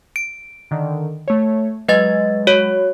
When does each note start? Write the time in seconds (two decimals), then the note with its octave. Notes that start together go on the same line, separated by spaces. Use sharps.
0.16 D7
0.71 D3 D#3
1.28 A3 C#5
1.89 F#3 G#3 B4 D#5 A6
2.47 F#4 C#5